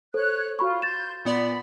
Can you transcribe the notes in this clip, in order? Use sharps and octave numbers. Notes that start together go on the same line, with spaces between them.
A4 C5 C#5 F#6
F4 F#4 B5 C#6
C6 G6 A6 E7
A#2 B3 D5 B5